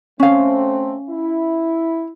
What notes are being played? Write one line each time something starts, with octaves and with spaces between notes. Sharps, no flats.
A3 C4 C#4 F5
E4